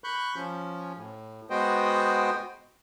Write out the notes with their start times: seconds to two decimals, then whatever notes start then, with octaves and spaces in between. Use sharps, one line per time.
0.04 B5 C#6 F#6 G6
0.36 F3 C#4
0.97 A2
1.50 G#3 B3 F#4 C5 D#5 G5